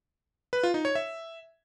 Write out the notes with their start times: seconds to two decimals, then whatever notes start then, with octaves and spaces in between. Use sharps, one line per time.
0.53 B4
0.63 F4
0.74 D#4
0.85 C#5
0.95 E5